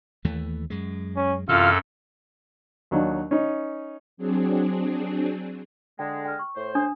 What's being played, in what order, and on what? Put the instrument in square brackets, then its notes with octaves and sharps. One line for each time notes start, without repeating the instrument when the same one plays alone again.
[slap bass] D#2 E3 A3
F#2 G#3
[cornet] C#4
[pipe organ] F#2 A4 [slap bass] C3 E3 [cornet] F4 [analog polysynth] F5 F6
[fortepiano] D#2 F#3 D4 D#4
C#4 D#4
[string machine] F#3 C4 D4 G#4
[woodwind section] D3 G#3 [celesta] G5
[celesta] G5 F6
C#6
[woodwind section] A2 C5
[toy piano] D4 [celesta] G#5 D#6